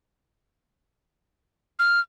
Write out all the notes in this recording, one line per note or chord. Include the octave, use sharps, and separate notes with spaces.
F6